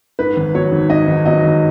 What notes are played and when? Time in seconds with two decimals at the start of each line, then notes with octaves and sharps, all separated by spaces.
0.19 G#2 B4
0.37 G#1
0.54 F#3 C#5
0.72 G#1
0.89 G#2 D#5
1.08 G#1
1.25 F#3 D#5
1.44 G#1